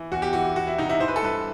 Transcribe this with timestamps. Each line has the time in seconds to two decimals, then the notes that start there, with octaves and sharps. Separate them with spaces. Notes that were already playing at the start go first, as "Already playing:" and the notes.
Already playing: E3
0.12 E2 F#4
0.22 G4
0.33 E3 F#4
0.56 E3 F#4
0.67 E4
0.78 C3 D#4
0.89 E4
1.00 E3 C5
1.08 B4
1.16 A4
1.22 G2 B4